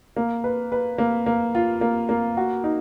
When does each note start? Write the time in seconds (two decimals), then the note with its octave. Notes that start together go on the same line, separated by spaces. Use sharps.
0.17 A#3
0.44 B4
0.72 B4
0.98 A#3
1.26 A#3
1.55 F4
1.81 A#3
2.09 A#3
2.37 F#4
2.64 D#4